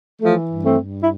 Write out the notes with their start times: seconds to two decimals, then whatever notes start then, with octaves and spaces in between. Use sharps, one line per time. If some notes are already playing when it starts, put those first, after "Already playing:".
0.21 E3 F3 A3
0.50 G2
0.64 A3 C4
0.78 G2
1.02 E4